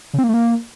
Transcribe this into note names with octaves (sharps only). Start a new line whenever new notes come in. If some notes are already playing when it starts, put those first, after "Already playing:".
C#3
C4
A#3
A3
A#3